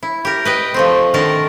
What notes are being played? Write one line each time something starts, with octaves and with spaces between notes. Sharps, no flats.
E4
G4 A#4
B4 D#5 G5
F3 A3 C4
D3 D#3 A3 A#4 A5